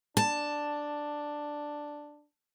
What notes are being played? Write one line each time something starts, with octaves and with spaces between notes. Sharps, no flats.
D4 A5